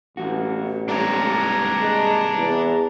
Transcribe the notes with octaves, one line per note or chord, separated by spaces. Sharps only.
A1 E2 F#4
G#2 C3 G3 D4 C#5 A#5
G#3
E2